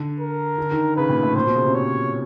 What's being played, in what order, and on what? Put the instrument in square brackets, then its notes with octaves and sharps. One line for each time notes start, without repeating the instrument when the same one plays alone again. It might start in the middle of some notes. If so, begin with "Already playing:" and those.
Already playing: [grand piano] D3
[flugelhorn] A#4
[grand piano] D3
D#3
[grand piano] C#3 [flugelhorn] B4
[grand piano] A#2
A2
[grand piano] A#2 [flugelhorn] C5
[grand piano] B2
C#3
C3
[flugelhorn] C#5